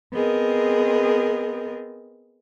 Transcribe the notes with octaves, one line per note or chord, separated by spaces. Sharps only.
B3 C4 G#4 A#4 D#5